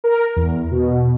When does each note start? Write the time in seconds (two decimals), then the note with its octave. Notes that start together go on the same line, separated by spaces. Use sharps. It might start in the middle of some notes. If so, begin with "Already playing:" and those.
0.04 A#4
0.36 E2
0.71 B2